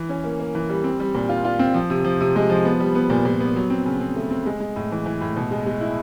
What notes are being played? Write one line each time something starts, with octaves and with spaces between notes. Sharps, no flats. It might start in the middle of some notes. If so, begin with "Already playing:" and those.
Already playing: E3
C#4
A#3
A#3
E3
G3
C4
G3
A#2
F4
F4
C4
F3
C3
F3
C3
G#3
F3
B3
G3
B3
A#2
A#2
B3
F#3
C4
C#3
C4
A3
C4
G#3
G#3
A2
E3
E3
A2
B2
G#3
G#3
E4